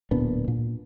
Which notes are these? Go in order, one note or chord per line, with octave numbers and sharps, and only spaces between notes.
D1 A#2 B3 D4
A#2